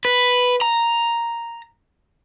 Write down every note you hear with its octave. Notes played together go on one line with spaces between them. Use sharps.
B4
A#5